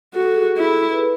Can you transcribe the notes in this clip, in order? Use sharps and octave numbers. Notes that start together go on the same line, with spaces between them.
F#4 A4
A4
G#4
G#4
E4
B4